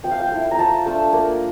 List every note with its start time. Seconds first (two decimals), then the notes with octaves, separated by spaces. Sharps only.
0.04 F3 G5
0.11 F5
0.20 G5
0.32 A3 E4
0.51 A#5
0.58 F3 A5
0.86 A3 D4 F4
1.13 A#3